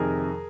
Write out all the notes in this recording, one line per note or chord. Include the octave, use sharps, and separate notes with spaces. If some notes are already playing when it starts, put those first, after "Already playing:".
Already playing: F2 C3 D#3 G#4 A#4